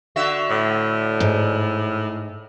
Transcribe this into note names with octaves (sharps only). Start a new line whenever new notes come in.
D3 F#4 E5
A2
G#2